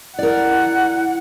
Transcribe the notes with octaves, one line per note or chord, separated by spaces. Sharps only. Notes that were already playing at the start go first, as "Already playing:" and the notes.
E4 A#4 D5 F#5